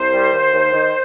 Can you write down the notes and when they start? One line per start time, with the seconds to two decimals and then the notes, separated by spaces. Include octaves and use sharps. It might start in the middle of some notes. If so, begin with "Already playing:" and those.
Already playing: C2 C5
0.13 G3
0.32 D#2
0.53 D#2
0.73 D#3